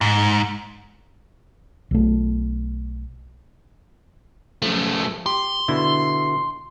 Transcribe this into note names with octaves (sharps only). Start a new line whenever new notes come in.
G#2
B1 A3
F#2 F3 A3
G4 C6
B2 D3 E4